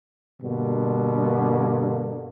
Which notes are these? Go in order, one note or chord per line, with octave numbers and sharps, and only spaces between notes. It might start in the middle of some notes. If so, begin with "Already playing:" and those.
G2 B2 D3 A#3